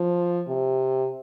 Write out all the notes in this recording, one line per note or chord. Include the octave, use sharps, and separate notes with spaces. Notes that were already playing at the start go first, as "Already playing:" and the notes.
Already playing: F3
C3